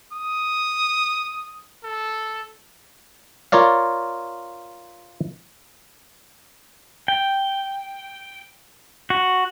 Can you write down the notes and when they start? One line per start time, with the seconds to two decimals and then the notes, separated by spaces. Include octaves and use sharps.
0.13 D#6
1.84 A4
3.52 F4 A#4 C#5 D5 F5
7.08 G5
9.10 F#4